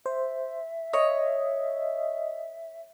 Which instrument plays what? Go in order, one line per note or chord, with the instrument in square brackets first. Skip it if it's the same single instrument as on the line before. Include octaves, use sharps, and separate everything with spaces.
[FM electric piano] C5 [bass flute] E5
[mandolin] C#5 [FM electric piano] D#5